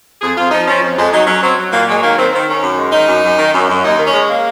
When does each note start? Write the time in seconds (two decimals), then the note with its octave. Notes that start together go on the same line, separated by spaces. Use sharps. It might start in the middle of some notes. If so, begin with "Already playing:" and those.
0.22 F2 G#4
0.37 F2 F4
0.51 F3 D#4
0.67 F3 C#4
0.82 F2
0.97 F2 G#3
1.13 F#3 D#4
1.27 F#3 C#4
1.42 F#3 C4
1.58 F#3
1.73 A#2 A#3
1.88 F#3 G#3
2.02 D#3 A#3
2.18 D#3 C4
2.33 D#3 C4
2.48 D#3 C#4
2.63 F#2
2.78 G#3
2.93 D#3 D#4
3.08 F#2
3.24 F#2
3.38 D#3
3.53 F#2
3.68 F#2
3.84 D#2 D#4
3.98 D#3
4.06 C#4
4.14 G#3
4.29 A#3